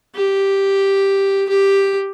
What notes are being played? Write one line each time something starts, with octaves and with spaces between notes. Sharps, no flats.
G4
G4